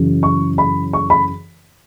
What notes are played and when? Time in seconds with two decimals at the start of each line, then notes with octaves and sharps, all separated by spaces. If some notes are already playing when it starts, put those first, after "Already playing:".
Already playing: F#2 C#3 E3
0.23 C#6
0.58 B5
0.93 C#6
1.10 B5